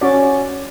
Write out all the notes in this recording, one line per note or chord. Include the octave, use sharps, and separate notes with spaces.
C#4 F#4 C#5 D5